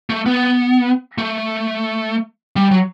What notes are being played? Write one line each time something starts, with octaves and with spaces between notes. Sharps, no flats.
A3
B3
A3
G3
F#3